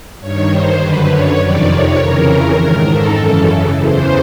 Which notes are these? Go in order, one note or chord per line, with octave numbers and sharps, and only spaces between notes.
G2 D#3 C#5
C5
F#2 D3 B4
C#5
F2 C3 D#3 D5
C#5
F2 C#3 E3 A#4
G#2 D#3 A#4
A4
F#2 C#3 E3 A4
E2 C#3 E3 C5